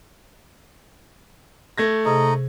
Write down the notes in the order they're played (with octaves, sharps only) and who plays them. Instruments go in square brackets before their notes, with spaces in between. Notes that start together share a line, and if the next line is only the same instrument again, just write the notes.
[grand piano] A3 G#6 A#6
[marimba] C3 G#4 [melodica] D#4 D#5